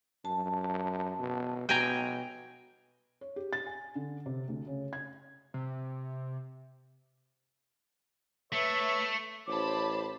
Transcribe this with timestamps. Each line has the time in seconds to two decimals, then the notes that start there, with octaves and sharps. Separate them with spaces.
0.25 F#2 A5
1.19 B2
1.69 B2 G5 G#5 A#5
3.21 C#5
3.36 G4
3.53 A6
3.67 G#5
3.95 D3
4.26 C3
4.48 D2
4.67 C#3
4.93 G#6
5.54 C3
8.52 A3 B4 C#5 E5
9.48 A1 C5 C#5 A5 B5 D6